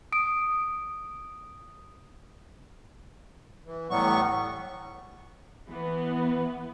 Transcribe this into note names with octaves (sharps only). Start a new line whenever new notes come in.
D#6 D7
E3
A2 E3 F#3 G3 B3 C#6
E3 B3